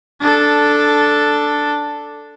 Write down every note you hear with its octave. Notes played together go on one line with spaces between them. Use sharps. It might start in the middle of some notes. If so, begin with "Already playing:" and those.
D4 A4